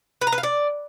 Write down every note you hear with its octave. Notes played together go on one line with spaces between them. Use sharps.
B4
A#5
B4
F5
D5